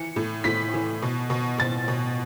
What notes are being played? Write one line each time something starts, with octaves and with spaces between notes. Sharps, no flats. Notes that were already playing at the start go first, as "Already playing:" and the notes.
Already playing: E3 C#7
A2
A2 B6
E3
B2
B2
B2 A6
B2